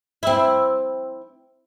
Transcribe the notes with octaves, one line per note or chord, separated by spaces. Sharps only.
C4 E4